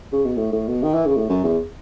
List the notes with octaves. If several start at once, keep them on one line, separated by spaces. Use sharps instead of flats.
C#3
B2
A2
A2
B2
D#3
E3
C#3
A2
F#2
E2